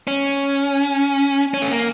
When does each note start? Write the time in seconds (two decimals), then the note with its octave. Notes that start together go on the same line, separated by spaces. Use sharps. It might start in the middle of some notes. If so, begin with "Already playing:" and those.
0.07 C#4
1.54 C#4
1.62 A3
1.71 A#3